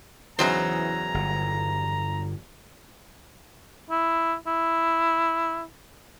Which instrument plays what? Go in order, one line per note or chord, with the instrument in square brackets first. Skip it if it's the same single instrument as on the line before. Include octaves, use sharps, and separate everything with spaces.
[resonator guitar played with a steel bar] E2 F#3 C5 [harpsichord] C#3 E3 D#4 [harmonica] A#5
[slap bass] G1
[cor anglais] E4
E4